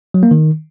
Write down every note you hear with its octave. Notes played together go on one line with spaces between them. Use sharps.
F#3
A#3
D#3